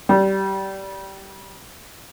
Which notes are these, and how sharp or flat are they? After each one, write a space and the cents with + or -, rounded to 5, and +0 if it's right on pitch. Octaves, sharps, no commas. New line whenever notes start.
G3 -20